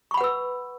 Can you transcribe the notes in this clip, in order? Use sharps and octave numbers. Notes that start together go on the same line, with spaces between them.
B4 F#5 B5 C#6 E6